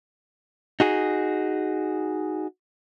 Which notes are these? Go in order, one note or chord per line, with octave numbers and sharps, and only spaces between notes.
D#4 F#4 G#4